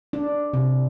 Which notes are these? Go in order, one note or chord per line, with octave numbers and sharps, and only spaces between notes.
D4
C3